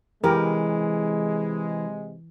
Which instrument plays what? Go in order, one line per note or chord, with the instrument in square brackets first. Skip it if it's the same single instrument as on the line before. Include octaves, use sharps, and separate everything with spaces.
[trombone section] C3 G#3 [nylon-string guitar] E3 [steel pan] G4 A#4